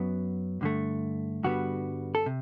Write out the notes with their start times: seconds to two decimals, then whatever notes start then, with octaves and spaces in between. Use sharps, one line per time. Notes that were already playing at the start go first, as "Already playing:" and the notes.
Already playing: F#2 F#3 B3
0.61 G2 D3 A3
1.43 G2 D3 G3 B3 F#4
2.15 A4
2.26 C3